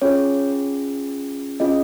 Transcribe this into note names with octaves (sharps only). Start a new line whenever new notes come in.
C#4 F4 G#4 C#5
C#4 F4 G#4 D#5